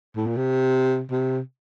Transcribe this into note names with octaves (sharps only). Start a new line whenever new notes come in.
A2
A#2
C3
C3